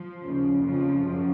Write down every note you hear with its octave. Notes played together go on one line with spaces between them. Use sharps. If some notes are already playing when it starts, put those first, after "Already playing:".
Already playing: F3
D#2 C#3
F2 C#3 F3
F#2 C#3